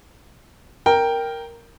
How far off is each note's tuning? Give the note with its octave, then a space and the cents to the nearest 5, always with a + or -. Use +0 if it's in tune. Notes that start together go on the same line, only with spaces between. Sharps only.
A#4 +0 G5 +0